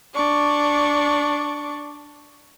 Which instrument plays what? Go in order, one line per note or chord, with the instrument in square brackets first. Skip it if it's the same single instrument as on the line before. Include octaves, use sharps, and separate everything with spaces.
[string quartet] D4 D5 C#6